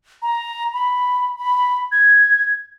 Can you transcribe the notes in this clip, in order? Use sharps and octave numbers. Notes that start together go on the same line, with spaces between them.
A#5
B5
B5
G#6